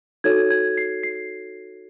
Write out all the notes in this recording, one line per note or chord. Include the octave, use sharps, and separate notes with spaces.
D#4 F#4 A4 C#5 G#6
G#6
C7
C7